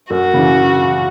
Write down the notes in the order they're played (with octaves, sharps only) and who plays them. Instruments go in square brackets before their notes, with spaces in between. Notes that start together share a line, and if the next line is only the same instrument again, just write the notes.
[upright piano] F#2 [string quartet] F#4
[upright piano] C#3 E3